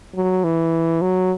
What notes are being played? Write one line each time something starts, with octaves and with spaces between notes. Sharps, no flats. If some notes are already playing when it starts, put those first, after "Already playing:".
F#3
E3
F#3